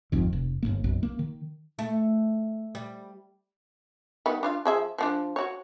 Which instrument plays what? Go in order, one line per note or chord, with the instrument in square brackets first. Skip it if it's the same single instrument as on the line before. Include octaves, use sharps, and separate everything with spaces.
[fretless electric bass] G#1 F2 D#3
F1
G1 D#2 A#3
B1 F#2
A#3
D#3
[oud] A3
G3
[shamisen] D#3 G3 B3
D4 F4 F5
F3 G#4 E5
F3 B3 D4
F#4 C#5